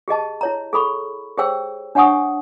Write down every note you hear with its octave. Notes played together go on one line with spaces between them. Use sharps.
G4 G#4 D#5 A5
E4 C#5 A#5
G#4 A4 B5 C#6
G4 G#4 C5 C#5 G5 E6
D4 C#5 F#5 G#5 C#6 D#6